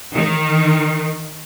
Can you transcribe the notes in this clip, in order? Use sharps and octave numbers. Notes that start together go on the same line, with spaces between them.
D#3